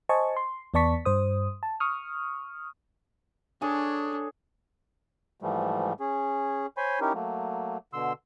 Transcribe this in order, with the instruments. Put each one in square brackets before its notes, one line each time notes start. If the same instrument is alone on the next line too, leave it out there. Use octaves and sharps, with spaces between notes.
[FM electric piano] C5 D#5 G#5 A5 C#6
C6
E2 B3 D5 A5 C#6 B6
G2 C5 D#6
A5
C#6 D#6 F6
[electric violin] D4 [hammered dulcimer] G#4 A4 C#5
[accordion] G#2 E3 F3 G3 A3
C#4 G#4
C5 C#5 G#5 B5 C6
C#4 D#4 E4 G4 A#4
F#3 A3 A#3
B2 D3 C6 E6